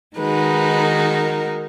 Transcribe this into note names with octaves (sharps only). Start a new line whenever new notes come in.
D#3 G#3 D#4 F#4 B4
A#4